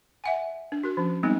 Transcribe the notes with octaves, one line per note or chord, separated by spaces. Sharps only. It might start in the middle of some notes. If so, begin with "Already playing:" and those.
E5 F#5 G#5
D4
F#4 A#4
F3 C#4
G3 G#3 B3 C4 D#4